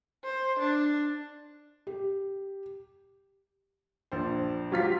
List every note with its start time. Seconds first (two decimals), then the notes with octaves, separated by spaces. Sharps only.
0.24 C5
0.59 D4
1.87 G4
4.12 A#1 D4 C5
4.72 F#3 F4 G4 B6